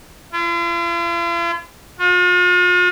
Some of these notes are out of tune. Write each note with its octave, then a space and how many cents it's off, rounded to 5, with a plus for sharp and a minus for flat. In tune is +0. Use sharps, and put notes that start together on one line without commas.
F4 -45
F4 +45